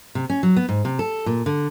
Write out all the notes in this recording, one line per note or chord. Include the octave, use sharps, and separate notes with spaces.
C3
C#4
F#3
B3
G#2
C3
A4
A#2
D3